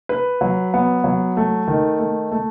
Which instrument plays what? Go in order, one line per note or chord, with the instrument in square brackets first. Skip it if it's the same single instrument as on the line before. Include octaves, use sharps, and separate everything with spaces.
[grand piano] B4
F#3
B3
F#3
A3
D#3
A3
A3